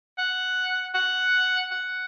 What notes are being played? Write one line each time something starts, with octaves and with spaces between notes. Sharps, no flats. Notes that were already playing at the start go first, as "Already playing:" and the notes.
F#5
F#5
F#5